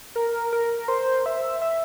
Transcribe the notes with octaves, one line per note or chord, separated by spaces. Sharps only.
A#4
A#4
C5
E5
E5